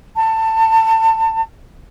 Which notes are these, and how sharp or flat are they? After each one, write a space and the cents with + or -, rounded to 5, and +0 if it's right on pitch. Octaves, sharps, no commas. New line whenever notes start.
A5 +25